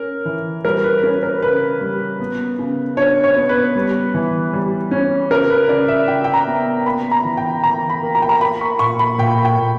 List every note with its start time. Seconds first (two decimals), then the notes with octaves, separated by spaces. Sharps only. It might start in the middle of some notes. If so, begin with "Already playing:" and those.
Already playing: C#4 A#4
0.25 E3
0.65 G3 A#4
0.84 B4
1.03 C#4 A#4
1.23 A#4
1.42 C#3 B4
1.81 G3
2.20 B3
2.59 C#3
2.97 D4 C#5
3.24 C#5
3.36 B3
3.49 B4
3.76 G3
4.14 E3
4.53 G3
4.91 C#4
5.31 C#3 A#4
5.50 B4
5.69 C#3 D5
5.88 E5
6.08 C#3 G5
6.24 G5
6.34 A#5
6.47 B3
6.86 A#3 B5
7.11 A#5
7.24 E3
7.37 G5
7.64 E3 A#5
7.90 B5
8.02 A#3
8.15 A#5
8.22 G5
8.29 A#5
8.41 A#3 B5
8.61 C#6
8.79 A#2 C#6
8.99 B5
9.18 A#2 G5
9.45 G5
9.58 A#2